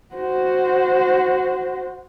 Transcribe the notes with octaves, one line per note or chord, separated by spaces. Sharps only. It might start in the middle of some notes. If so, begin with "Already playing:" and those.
F#4 C5